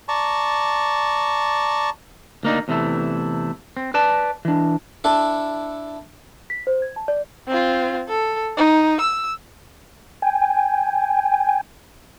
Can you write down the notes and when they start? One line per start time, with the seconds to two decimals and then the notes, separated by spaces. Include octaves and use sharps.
0.08 D5 A5 A#5 C#6
2.43 D2 A#3 D#4 D5
2.68 E2 C3 E3 A3 E4
3.77 C4
3.94 B4 D5 A5
4.45 E3 D4
5.04 D4 E4 A4
6.50 B6
6.67 C5
6.82 G#6
6.96 A5
7.08 D5
7.48 C4 F4
8.08 A4
8.57 D#4
9.00 E6
10.22 G5 G#5